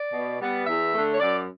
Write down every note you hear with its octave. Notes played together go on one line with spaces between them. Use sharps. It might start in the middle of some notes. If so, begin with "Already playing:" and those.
Already playing: D5
B2
G3 B3
E2 E5
D3 A3
C#5
F#2 D5